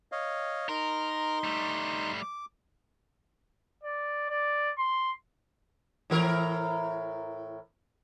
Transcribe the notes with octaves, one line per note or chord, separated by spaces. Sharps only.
C#5 D#5 F5
D#4 A#4 C6
G3 A3
D6
D5
D5
C6
A2 E3 A#4